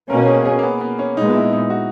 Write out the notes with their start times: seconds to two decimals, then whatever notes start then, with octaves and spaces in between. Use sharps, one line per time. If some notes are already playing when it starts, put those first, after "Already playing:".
0.09 B2 A#3 C#4 A#4
0.27 G#4
0.45 G#4
0.59 A#3
0.63 B3
0.81 B3
0.99 C#4
1.17 A#2 G#3 B3 D#4
1.35 E4
1.53 D#4
1.70 F#4